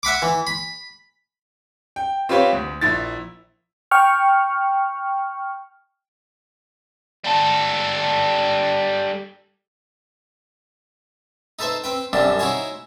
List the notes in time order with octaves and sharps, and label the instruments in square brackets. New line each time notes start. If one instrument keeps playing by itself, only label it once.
[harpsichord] E5 F#5 B5 D6
E3
B5
[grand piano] G5
C4 F4 G4 B4 C#5
D2
A#1 E4 A6
[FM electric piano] G5 C#6 F6
[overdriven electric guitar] G3 A4
[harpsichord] D#4 A4 B4 C5 E5
C4 B4 G5
C2 F#2 D3 G3 C4 D4
D#4 E4 F#4 C5 C#5 G#5